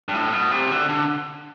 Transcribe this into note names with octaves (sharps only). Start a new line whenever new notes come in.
G2
A2
B2
C3
D3
D3